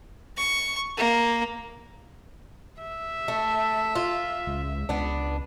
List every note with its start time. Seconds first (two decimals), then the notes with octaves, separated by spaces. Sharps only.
0.37 C#6
0.97 A#3
2.82 E5
3.28 A3
3.95 F4
4.47 C#2
4.89 C#2 B3 D4